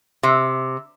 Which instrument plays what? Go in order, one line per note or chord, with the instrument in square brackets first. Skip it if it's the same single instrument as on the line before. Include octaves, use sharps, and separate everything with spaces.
[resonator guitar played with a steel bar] C3